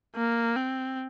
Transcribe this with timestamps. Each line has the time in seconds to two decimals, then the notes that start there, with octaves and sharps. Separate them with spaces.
0.17 A#3
0.57 C4